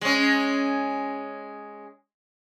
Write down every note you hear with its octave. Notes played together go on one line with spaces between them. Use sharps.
G#3 C#4